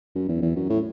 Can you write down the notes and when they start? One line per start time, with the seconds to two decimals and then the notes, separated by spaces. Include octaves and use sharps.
0.15 F#2
0.29 E2
0.42 E2
0.56 F#2
0.70 A2